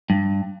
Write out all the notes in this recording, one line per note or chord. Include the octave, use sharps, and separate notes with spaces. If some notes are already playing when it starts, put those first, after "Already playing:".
G2